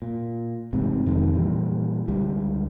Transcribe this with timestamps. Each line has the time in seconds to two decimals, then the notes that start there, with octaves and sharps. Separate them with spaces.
0.02 A#2
0.73 A1 G#2 C3
1.05 F1 F2 D#3 G#3
1.34 A#2 E3 G3
2.08 C#2 D3 G3